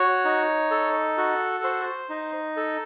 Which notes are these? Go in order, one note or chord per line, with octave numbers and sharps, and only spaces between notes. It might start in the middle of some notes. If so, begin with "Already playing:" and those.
Already playing: F#4 C#5
D#4
A4
F#4
C5
D#4
A4